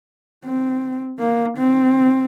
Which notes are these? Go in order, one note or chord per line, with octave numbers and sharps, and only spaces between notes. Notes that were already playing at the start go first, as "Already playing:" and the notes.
C4
A#3
C4